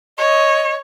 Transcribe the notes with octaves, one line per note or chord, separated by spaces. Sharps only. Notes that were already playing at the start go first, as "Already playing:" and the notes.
C#5 D#5